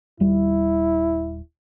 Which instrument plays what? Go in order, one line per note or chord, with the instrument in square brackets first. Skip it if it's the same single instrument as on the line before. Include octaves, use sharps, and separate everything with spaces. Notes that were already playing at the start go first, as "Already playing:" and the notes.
[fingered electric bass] D#1 G3 [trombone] E4